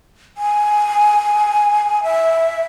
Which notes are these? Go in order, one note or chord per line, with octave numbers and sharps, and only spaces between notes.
G#5
E5